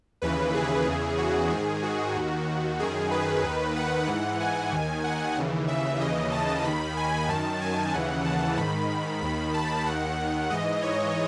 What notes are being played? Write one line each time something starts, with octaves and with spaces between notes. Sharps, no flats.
D#2 C#3 E3 B4
G#4
E2 C#3 E3
F#4
G#2 D#3 G#4
F#4
D#2 D#3
F#2 D#3 G#4
B4
D#2 D#3
F#5
G#2 E3 F#5
G#5
D#2 D#3
F#5
D#2 C#3 E3
E5
D#2 C#3 E3 D#5
A5
D#2 D#3 B5
G#5
F#2 D#3 A5
G#5
D#2 C#3 E3 F#5
A5
G#2 D#3 B5
D#2 D#3 B5
A5
D#2 D#3 F#5
G#2 E3 D#5
C#5